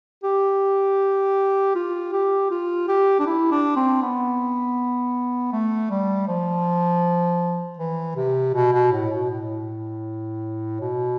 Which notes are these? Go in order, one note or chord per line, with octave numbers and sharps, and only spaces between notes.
G4
F4
G4
F4
G4
D4
E4
D4
C4
B3
A3
G3
F3
E3
C3
B2
B2
A2
B2
A2
B2